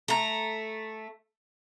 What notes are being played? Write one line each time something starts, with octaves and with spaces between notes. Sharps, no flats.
A3 A#5